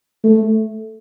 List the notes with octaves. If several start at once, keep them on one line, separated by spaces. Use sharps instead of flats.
A3